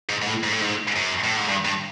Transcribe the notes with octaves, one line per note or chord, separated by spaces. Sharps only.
G#2
G#2
A2
G#2
A2
G#2
F#2
A2
G#2
G2
G2